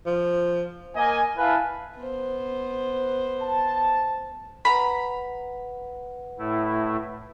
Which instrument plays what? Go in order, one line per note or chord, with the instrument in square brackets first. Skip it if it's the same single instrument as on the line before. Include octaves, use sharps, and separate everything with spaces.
[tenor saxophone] F3
[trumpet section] A#3 D#5 G#5
E4 B4 F5 G#5 A5
[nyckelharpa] B3 C5
[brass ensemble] A5
[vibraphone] B4 F#5 [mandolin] A#5 B5
[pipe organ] A2 A3 E4